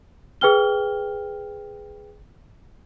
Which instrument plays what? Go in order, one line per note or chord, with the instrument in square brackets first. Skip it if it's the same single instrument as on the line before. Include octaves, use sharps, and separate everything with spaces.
[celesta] G#4 B4 G5 F6 G7